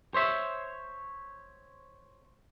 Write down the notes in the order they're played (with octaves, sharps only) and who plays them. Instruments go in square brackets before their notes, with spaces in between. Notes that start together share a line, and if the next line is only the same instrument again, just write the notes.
[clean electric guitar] C5 C#5 E5